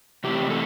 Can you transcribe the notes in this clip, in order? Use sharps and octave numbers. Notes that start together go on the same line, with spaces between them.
C3 E3 A3 C4 G4
A4